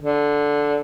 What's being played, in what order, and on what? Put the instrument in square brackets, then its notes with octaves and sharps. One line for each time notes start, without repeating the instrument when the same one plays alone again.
[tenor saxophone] D3